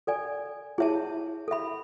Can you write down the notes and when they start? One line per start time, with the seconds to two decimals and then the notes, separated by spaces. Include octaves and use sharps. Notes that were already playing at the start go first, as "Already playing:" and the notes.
0.07 A4 D5 G#5
0.78 E4 G#4 C#5 E5 A5
1.48 A4 E5 B5